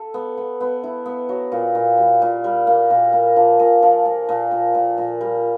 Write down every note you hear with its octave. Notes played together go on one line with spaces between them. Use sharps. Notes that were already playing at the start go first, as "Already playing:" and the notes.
Already playing: A4
B3
B3
B3
E4
B3
F#3
A#2
A#2
G3
A#2
G3
A#3
A#2
A#3
F3
A#2
F3
A#3
A#2
A#2
A#2
A#2
G3